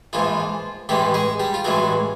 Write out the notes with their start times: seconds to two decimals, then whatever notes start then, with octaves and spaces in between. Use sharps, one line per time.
0.13 A#1 G#2 E3 F3 F4
0.89 A1 G2 E3 G3 G#3 G4
1.14 G#3 G#4
1.40 G3 G4
1.54 F4
1.64 A1 G2 E3 F#3 G#3 F#4